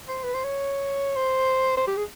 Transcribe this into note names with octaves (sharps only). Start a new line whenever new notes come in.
C5
B4
C5
C#5
C5
C5
G4
G#4